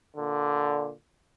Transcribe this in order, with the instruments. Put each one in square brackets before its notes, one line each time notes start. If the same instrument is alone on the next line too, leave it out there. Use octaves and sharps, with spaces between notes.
[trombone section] A#2 D3